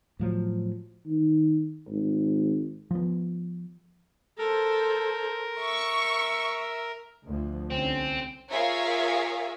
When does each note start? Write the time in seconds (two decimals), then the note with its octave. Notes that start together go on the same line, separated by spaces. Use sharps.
0.19 A2 F3 F#3
1.06 D#3
1.89 G#1
2.91 F3 B3
4.38 A4 A#4 C5
5.60 E5 C#6
7.25 D2 F3
7.71 C2 D3 C4 C#4
8.50 F4 G#4 A#4 C#5 E5 F5